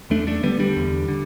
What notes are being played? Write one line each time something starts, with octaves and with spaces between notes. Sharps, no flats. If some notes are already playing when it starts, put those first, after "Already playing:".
E2 A3 D4
A3 D4
D3 G3 B3
D3 G3
E2
D3